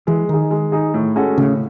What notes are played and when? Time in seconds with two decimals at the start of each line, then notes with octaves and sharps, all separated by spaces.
0.07 E3 G#3
0.29 D#3 D#4 G#4
0.51 G#3
0.72 D#4 G#4
0.94 A2
1.16 G#3 C#4 F#4 A4
1.38 A2 C#3